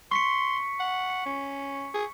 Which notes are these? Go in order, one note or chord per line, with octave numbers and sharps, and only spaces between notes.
C6 C#6 B6 C#7
F#5
C#7
C#4
G#4